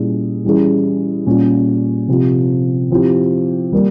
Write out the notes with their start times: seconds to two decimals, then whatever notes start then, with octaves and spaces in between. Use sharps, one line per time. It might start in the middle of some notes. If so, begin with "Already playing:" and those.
Already playing: A#2 G3 C#4 E4 G#4
0.44 E3 G3 C#4 E4 G#4
1.26 A#2 G3 C#4
2.08 C3 F3 C4 G4
2.91 F3 C4 E4 G4
3.72 G3 A#3